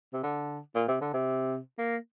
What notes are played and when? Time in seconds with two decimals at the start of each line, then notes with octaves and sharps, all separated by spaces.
0.13 C3
0.23 D3
0.75 A#2
0.88 C3
1.01 D3
1.14 C3
1.78 A#3